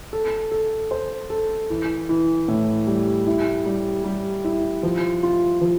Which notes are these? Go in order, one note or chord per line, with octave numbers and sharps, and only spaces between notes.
A4
A4
C5
A4
E3
E3
A2
G3
E4
G3
G3
E4
F3
F4
F3